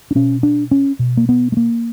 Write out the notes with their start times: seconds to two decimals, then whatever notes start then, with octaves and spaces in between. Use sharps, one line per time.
0.11 D4
0.15 B2 C#4
0.43 D4
0.71 C#4
0.99 B2
1.17 A#3
1.29 B3
1.52 A3
1.57 A#3